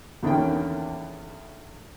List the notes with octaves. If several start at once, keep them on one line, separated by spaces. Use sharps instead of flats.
E2 D3 D#3 A#3 C#4 G5